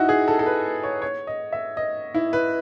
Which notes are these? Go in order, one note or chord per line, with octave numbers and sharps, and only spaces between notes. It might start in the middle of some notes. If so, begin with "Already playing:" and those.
Already playing: D#4 E4 F#4
G#4
A4
A4
B4
C#5
C#5
D#5
E5
D#5
E4
B4